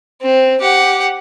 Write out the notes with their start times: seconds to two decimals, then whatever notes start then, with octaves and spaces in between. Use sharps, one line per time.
0.22 C4
0.61 G4 F#5